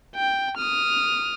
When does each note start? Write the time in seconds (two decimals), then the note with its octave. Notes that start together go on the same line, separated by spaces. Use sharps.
0.16 G5
0.57 D#6 F6